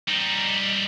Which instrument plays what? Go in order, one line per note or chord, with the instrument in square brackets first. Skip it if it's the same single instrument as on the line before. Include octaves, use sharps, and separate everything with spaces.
[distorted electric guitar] G3 D#4